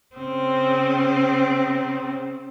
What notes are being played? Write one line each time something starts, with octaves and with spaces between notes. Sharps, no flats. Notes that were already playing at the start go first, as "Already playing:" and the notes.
C#3 C4